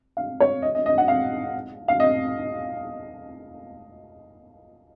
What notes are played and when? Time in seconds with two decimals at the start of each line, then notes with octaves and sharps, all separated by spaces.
0.17 F5
0.40 C#5
0.62 D#5
0.75 D#5
0.86 D#5
0.98 F#5
1.08 F5
1.88 F5
2.00 D#5